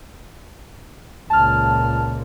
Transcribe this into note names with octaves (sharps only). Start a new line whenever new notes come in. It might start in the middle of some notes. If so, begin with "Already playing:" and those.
C#2 A#2 A5 F6